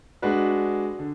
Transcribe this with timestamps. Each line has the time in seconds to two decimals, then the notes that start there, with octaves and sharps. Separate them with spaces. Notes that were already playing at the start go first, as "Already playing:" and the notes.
0.22 G#3 D4 F#4 B4
0.99 D3